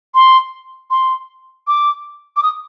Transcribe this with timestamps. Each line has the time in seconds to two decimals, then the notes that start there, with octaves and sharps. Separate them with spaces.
0.15 C6
0.91 C6
1.67 D6
2.37 D6
2.43 D#6